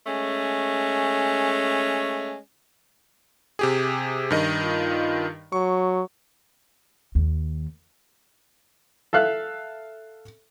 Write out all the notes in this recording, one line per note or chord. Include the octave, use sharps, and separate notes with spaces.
G#3 A3 C#4
C3 G4 G#4
G2 D#3 D#5
F4
F#3 C#6
D#2
A4 E5 F5 F#6